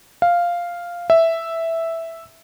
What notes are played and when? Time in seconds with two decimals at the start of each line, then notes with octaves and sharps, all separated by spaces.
0.22 F5
1.10 E5